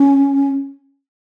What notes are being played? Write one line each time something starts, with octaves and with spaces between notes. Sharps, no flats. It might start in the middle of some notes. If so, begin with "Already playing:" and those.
Already playing: C#4